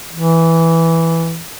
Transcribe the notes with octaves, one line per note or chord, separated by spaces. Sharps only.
E3